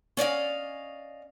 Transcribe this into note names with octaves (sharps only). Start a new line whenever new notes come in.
C#4 D5 D#5 F5